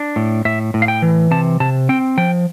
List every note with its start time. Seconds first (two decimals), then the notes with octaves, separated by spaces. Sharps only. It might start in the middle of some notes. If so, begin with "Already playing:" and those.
Already playing: D4
0.16 A2
0.45 A2 E5
0.74 A2
0.82 F5
0.88 G5
1.02 E3
1.31 C3 A5
1.60 C3 A5
1.89 C4 G5
2.18 F3 G5